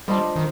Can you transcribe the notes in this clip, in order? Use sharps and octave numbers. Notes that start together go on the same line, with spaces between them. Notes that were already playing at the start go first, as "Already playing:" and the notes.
G3 D4 F4 C5 D#5
D#3